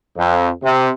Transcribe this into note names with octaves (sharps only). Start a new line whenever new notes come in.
F2
C3